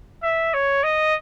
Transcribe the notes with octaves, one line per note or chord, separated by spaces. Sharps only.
E5
C#5
D#5